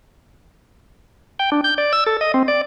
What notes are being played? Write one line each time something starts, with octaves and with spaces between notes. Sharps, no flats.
G5
D4
G6
D5
E6
A4
D#5
C4
D5